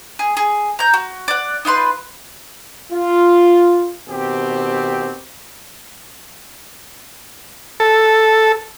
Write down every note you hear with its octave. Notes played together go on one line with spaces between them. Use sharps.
G#4
G#4
A#5 G6
F#4
D5 F#5
D#4 F4 B4 C6
F4
B2 D#3 C4 G4
A4